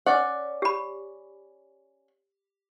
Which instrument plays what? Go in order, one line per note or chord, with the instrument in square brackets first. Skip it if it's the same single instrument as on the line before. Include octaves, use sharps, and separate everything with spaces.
[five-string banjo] C#4 D5 F#5
[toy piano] G4 B5